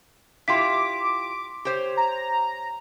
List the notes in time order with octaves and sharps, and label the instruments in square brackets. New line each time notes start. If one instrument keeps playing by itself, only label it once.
[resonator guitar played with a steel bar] E4 F4 G4 [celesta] C6 B6 [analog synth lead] D6
[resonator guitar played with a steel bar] G4 C5 C#5
[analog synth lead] A#5